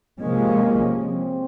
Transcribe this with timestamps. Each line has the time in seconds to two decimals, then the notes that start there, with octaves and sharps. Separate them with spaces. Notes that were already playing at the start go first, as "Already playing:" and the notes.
0.21 C3 F3 G#3 A#3 C#4
1.06 C4